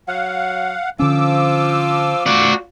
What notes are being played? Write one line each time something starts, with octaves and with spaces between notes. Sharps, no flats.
F#3 F5 F#5
D3 F3 C#4 F4 D6 E6
F#4 D5